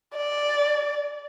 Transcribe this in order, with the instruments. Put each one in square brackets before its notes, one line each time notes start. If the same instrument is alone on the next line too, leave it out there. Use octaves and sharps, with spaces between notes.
[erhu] D5